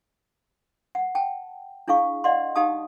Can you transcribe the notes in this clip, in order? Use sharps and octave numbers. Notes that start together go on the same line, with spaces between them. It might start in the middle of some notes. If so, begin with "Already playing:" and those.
F#5
G5 A5
D4 E4 G#4 F5 C#6
D5 D#5 F5 F#5 C6
D#4 G4 F5 A5 D#6